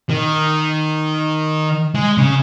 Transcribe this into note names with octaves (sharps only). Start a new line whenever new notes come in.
D#3
G#3
C#3